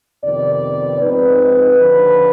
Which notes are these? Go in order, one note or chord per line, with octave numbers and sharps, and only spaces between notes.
F2 C3 D#3 B3 D5
G#2 F3 C4 D#4 B4
D#2 D3 F3